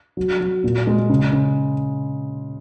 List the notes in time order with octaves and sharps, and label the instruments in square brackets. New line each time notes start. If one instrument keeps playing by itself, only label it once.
[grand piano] F#3
F#3
A#2
G#3
C#3
C#3